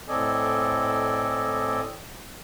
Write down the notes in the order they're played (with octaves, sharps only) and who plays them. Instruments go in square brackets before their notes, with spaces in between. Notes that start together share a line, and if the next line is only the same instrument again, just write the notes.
[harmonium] A2 C4 A4 D5 D#5 G#5